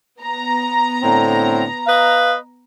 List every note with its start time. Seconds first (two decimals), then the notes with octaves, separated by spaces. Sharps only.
0.21 B3 A#5
1.03 A2 D3 C4
1.87 B4 D#5 F5